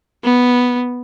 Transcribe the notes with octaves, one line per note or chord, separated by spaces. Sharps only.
B3